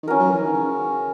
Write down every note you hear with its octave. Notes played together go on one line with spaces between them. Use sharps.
D#3
E3 C#4 F#4 A#4
F#3
E3
D#3
C#3